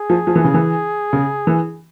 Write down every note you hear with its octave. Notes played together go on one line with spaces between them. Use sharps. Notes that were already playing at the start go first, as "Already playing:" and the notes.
Already playing: G#4
F3
F3
E3
C#3
E3
C#3
E3